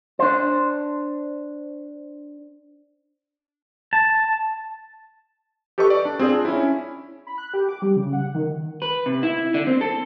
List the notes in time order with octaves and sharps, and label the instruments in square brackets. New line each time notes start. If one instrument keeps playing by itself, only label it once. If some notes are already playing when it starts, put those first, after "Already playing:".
[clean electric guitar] D4 C5
[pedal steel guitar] A5
[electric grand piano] G4 A4 B4 D#5 C#6
D5
D4
C4 F4 G#4 C5 D5
D4
C#4 E4
[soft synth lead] B5
F#6
G4
D6
G3
C#3
F#5
D#3
[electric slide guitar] B4
C3
E4
D3
C4
A4